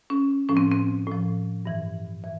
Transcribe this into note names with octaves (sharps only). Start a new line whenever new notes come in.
C#4
A2 F3 C#4
C4
C4
A2 F3
G2 E3
E3